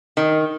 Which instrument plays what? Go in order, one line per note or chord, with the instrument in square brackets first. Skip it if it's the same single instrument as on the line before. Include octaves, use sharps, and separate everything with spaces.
[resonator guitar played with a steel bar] D#3